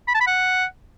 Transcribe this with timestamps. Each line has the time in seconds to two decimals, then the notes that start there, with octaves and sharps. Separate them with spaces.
0.08 B5
0.14 A5
0.21 B5
0.27 F#5